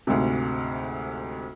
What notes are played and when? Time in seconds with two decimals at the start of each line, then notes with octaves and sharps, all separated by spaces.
0.07 D2 G#2 C3